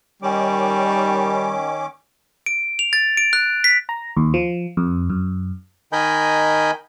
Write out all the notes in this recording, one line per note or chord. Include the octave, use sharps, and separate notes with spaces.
D#3 G3 C#4 D6
D7
F7
A6
D7
F#6
B6
A#5
D#2
F3
F2
F#2
D#3 A#4 D#5 G#5 B5 G6